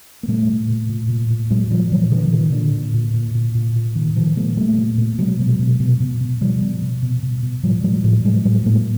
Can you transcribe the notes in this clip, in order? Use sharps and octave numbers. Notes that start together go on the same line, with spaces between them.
A#3
A#2 G3 A3
A#2
A#2
A#2
A#2
A#2
A#2 F#3 G#3
A#2 F3 G3
A#2 E3 F#3
A#2 D3 E3
A#2 D#3
A#2 D3
A#2
A#2
A#2
A#2
A#2
A#2
A#2 D#3
A#2 D#3 F3
A#2 G#3 A#3
A#2 G3 A3
A#2
A#2
B2 F#3 G#3
B2
B2
B2
B2
B2
B2 F3 G3
B2
B2
B2
B2
B2
A2 F3 G3
A2 F#3 G#3
F#3
A2 F3 G3
A2 F#3 G#3
A2 F#3 G#3
A2 G#3 A#3